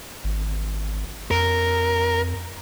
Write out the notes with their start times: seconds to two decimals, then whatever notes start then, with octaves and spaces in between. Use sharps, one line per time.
0.24 G#1
1.31 F2 A#4